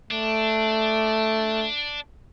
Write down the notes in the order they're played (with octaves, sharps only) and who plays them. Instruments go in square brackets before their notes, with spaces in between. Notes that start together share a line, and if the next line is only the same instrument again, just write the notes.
[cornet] A3 [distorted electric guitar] D4